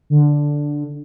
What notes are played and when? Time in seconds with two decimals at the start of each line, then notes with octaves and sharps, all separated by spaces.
0.10 D3